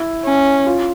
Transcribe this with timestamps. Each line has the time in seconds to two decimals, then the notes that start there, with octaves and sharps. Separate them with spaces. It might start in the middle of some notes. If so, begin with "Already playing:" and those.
Already playing: E4
0.25 C#4
0.67 F4